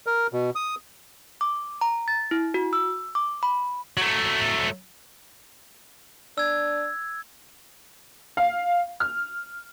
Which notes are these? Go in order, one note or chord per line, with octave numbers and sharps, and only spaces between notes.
A#4
B2
D#6
D6
A#5
A6
E4
F#4
E6
D6
B5
F#3 A3
D4 E6 G#6
F5
F6